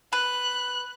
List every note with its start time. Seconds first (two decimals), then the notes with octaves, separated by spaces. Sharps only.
0.13 B4 F#6